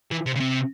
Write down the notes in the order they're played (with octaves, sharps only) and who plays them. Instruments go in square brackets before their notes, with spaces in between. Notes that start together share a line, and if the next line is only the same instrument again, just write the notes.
[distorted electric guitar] E3
C3
C#3
C3